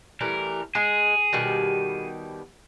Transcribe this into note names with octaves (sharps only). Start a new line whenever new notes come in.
E3 G3 A3 A#4
G#3 G#4
B2 D#3 G3